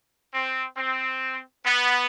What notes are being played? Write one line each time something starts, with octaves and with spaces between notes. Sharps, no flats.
C4
C4
B3